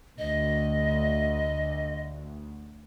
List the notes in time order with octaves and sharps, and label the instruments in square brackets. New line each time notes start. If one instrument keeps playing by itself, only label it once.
[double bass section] D2 [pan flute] D#5